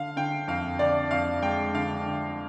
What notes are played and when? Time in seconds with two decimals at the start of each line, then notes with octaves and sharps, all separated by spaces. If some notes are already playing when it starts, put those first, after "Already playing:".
Already playing: D3 F5
0.16 D3 G5
0.48 F2 F5
0.79 D3 D5
1.11 F2 F5
1.42 G#3 G5
1.74 D3 F5
2.07 D3